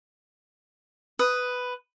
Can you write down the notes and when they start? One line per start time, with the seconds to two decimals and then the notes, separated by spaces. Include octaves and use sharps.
1.19 B4 D#6